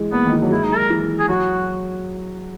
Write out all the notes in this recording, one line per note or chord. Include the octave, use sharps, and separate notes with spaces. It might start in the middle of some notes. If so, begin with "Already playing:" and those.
Already playing: E3 G#3
A#3 B3
D#3
E3
F#3
G#3 E4
D#4
A#4
E3
G#4
F#3 F#4